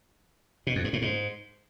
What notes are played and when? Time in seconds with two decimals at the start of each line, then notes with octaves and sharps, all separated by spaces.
0.67 B2
0.76 F2
0.84 G2
0.93 A2
1.02 G#2